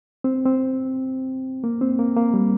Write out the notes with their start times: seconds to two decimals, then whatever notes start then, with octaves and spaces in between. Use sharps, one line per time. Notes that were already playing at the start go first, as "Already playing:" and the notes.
0.24 C4
0.46 C4
1.64 A#3
1.81 C4
1.99 A#3
2.16 A#3
2.34 G3